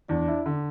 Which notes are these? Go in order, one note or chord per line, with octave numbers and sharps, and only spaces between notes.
E2 D4
E4
D3